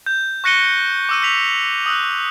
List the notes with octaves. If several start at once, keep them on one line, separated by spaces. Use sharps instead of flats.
G6
C#6 F#6 A#6 C#7 D#7 G7
D6 E6 D#7
E6 B6 F7
D#6 E6 F#6